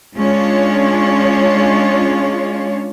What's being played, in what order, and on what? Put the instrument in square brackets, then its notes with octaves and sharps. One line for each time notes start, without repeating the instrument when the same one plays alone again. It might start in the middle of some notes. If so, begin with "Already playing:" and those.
[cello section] G#3 C#4 D4 F4 C#5